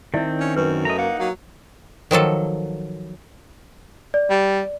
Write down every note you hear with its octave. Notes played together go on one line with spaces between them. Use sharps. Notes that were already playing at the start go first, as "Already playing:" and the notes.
D#3 C4 E4 D5 E5
C#4
F#2 B4
A3 D#5 A#5
A#3 D#4 F#5
F#3 A#3
D#3 F3 F#3 A4
D5
G3